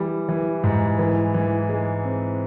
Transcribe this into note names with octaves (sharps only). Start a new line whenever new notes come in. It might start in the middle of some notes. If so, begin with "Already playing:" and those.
Already playing: E3 G3
E3
G#2
E3
E3
G#3
C4